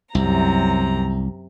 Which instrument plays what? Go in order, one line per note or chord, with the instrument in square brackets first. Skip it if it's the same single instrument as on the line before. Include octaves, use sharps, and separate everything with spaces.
[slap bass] C2 [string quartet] F#2 C3 A#5